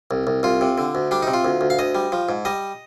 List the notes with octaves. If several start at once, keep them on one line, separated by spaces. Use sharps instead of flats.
C2
C2
C2 F4
C3
D3
D2
G3 D4
D#4
C3
F4
D2
D2
F5
D2 D#5
G3
F3
G#2
G3 D#5